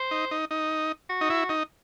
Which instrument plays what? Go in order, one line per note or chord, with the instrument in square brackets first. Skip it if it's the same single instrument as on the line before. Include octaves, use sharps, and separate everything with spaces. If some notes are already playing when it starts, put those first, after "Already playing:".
Already playing: [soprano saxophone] C5
[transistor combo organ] D#4
D#4
D#4
[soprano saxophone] F#4
[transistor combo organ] D#4
E4
D#4